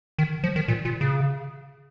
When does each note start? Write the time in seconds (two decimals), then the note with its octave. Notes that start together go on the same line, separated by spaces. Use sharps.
0.18 D#3
0.43 F3
0.56 D#3
0.68 A#2
0.85 A#2
1.01 C#3